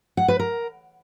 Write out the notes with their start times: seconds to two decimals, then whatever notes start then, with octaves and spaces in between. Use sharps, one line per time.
0.17 F#5
0.28 B4
0.39 A#4